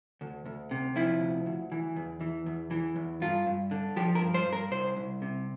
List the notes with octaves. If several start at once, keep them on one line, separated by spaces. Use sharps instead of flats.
D2
D2
C3
F3 E4
D2
D2
E3
E2
E3
E2
E3
E2
G2 F4
G2
D3
F3 G4
A#4
G2
C5
G2
A#4
C2 C5
C2
C3